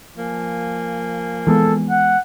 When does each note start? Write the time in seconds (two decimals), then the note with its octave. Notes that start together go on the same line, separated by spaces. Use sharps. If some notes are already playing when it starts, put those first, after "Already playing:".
0.18 F3 A#3 G#5
1.47 E3 G#3 B3 A4
1.90 F#5